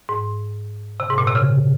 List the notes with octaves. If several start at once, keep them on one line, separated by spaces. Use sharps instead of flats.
G#2
C3
G#2
A#2
C3
C#3